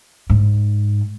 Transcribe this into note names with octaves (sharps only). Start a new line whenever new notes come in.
G#2